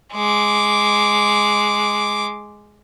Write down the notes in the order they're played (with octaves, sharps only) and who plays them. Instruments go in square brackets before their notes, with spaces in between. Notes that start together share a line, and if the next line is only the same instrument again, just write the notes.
[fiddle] G#3 D6